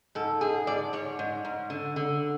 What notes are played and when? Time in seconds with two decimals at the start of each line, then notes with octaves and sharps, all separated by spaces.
0.15 G#2 A4
0.41 G#2 G#4
0.67 G#2 D5
0.93 G#2 C#5
1.19 G#2
1.45 G#2
1.70 D3
1.96 D3